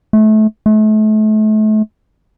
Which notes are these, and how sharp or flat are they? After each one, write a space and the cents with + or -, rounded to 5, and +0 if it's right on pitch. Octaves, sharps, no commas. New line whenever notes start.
A3 -25
A3 -35